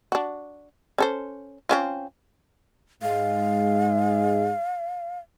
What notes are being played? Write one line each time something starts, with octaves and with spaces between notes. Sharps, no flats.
D4 F#4
C#4 A4 C5
C4 C#4 F4
G#2 G#3 F5